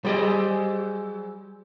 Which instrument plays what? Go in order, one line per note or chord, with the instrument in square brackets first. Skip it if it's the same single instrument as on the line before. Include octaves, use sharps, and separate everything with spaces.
[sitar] F#3 G#4 C5 [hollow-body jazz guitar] G3 G4 D#5